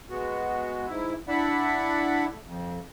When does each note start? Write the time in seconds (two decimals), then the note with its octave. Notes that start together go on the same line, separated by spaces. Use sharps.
0.10 G#3 B3 F#4
0.87 G#2 E4
1.28 D4 E4 D5 E5 F#5 B5
2.30 A3
2.44 F2